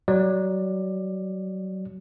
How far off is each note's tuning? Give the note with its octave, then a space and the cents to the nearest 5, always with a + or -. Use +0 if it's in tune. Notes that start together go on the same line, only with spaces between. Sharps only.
F#3 +25 D5 +20